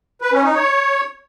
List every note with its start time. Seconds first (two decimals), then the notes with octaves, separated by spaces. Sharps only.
0.21 B4
0.33 C#4
0.44 D#4
0.55 C#5